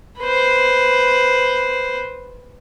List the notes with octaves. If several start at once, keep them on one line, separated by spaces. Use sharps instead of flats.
B4 C5